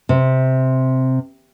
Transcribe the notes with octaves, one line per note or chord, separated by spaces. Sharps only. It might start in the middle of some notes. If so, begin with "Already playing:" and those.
C3